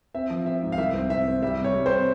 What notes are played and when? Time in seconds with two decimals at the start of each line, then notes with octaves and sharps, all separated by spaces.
0.14 C4 E5
0.30 F3
0.46 C4 E5
0.62 G#2
0.72 F5
0.78 C2 E5
0.94 C4
1.10 C4 E5
1.27 C4
1.43 G3 E5
1.58 C3
1.64 C#5
1.74 G3
1.86 C3 C5